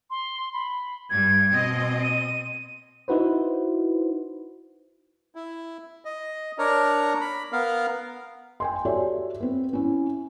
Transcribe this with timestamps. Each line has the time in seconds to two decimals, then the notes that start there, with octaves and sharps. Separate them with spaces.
0.10 C6
0.53 B5
1.10 G2 G3 G#6
1.52 B2 C4 D#5
2.02 D#7
3.08 D#4 E4 F#4 B4 C5
5.35 E4
6.05 D#5
6.59 D4 A#4 C#5 A#5
7.21 B5
7.52 B3 A#4 F5
8.60 G5 G#5 C6
8.85 F#4 G4 A4 C#5 D5 E5
9.40 B3 C4
9.73 C#4 E4